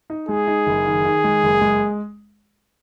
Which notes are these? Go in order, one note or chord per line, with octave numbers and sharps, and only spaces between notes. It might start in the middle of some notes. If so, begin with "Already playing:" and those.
D#4
G#3 G#4
D#4
F#1
D#3
D#3
G#3
F#1
G#3